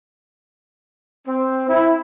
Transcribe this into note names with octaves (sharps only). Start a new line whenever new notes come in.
C4
E4